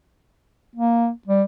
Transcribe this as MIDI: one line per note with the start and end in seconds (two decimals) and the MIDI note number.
0.76 1.09 58
1.28 1.42 55